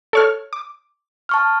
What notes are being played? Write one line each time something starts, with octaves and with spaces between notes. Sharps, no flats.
A4 C#5 F6
D6
A5 C#6 F6